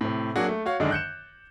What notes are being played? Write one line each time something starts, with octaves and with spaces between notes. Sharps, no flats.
A2 C3
F#3 A#3 D4 F#4 G#4
A3
F#4 C#5 F5
F#2 D3 D#3 G#3 D4
F#6 G6 C#7 E7